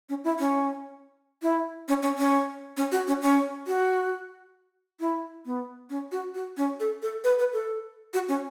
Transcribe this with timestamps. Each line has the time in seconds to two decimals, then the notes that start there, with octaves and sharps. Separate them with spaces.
0.09 C#4
0.24 E4
0.39 C#4
1.42 E4
1.88 C#4
2.02 C#4
2.18 C#4
2.77 C#4
2.92 F#4
3.07 C#4
3.22 C#4
3.67 F#4
5.00 E4
5.46 B3
5.90 C#4
6.12 F#4
6.34 F#4
6.57 C#4
6.80 A4
7.02 A4
7.24 B4
7.39 B4
7.53 A4
8.14 F#4
8.28 C#4